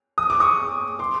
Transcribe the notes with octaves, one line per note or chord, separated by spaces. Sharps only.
D#6
D6
C#6 D#6
C6 D6